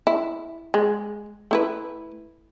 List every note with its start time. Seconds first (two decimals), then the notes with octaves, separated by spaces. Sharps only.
0.07 E4
0.74 G#3
1.51 A3 E4 B4